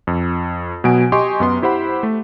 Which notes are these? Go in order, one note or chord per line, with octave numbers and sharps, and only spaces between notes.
F2
B2 F#3 B3 G#5 D7
G4 D#5 G#5 C6 C#6
F#2 B3 C6
E4 G4 C5 F#5 B5
A3